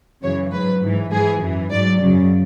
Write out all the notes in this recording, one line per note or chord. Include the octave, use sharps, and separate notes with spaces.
F#2 C#3 E3 C#5
G#2 F#3 B4
G#2 E3
G#2 E3 G#4
F#2 E3
G#2 F#3 D5
F#2 C#3 F#3